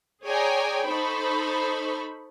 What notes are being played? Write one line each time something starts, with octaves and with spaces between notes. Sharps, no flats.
G#4 C#5 D5 G5 G#5 A#5
D#4 A4 C5 B5 C#6